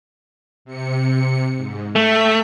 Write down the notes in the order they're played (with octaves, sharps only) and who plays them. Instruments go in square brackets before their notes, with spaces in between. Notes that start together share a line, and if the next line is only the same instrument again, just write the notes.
[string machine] C3 C#7
G#2
[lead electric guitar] A3 [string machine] G5 G6 B6